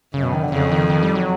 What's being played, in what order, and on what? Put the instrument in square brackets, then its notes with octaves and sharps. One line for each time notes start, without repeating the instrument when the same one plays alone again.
[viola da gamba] F#2 [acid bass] C#3
[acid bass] B2
D#3
D3
[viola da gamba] F2 [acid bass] C#3
[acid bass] D#3
D#3
G3
F#3